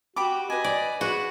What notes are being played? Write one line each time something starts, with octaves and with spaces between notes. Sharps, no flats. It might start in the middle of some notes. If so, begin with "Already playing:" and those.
F#4 G4 B5 D6
B4 D#5 G#5
D5
F#4 G#4 B4